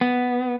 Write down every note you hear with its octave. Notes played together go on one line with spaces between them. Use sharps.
B3